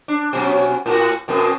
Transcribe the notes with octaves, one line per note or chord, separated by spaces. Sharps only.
D4
B2 F#3 C#4
A2 F#4
F2 B2